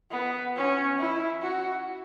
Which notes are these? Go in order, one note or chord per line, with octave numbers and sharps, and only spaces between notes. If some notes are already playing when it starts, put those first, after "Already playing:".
B3
C#4
E4
F#4